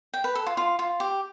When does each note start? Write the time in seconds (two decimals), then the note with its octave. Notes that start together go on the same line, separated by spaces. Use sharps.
0.14 G5
0.24 B4
0.35 A4
0.47 F4
0.57 F4
0.79 F4
1.00 G4